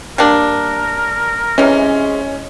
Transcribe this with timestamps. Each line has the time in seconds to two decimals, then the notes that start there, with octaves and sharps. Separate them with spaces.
0.18 G3 A#3 D4 A#4
1.58 C3 E3 G#3 C#4